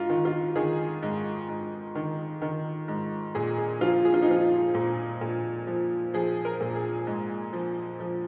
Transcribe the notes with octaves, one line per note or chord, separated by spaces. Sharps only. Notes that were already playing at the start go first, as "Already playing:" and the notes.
Already playing: G#2 F4
D#3
F4
D#3 G#4
G#2
G#2
D#3
D#3
G#2
A#2 G#4
G#4
F3 F4
G#4
F4
D#4
F3 F4
A#2
A#2
F3
F3 G#4
A#4
A#2
G#4
G#2
F3
F3